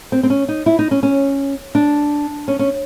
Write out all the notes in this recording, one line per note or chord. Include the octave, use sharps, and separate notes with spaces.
C4
C4
C#4
D#4
E4
D#4
C#4
C#4
D4
C#4
C#4